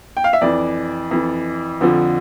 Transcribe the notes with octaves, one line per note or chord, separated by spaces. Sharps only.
G5
F5
E5
F2 E3 D5
F2 E3
F2 D3 F3